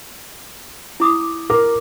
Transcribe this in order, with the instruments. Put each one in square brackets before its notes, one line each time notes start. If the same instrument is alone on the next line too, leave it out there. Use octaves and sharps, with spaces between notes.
[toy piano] E4 D6 D#6
[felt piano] A#4 [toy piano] D6